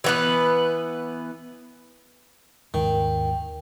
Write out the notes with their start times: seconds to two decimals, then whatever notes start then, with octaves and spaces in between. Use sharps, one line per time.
0.04 E3 B3 B4
2.74 D#2 G#2 D#3 G5